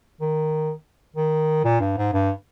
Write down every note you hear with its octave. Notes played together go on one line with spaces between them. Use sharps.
D#3
D#3
A#2
G2
G#2
G2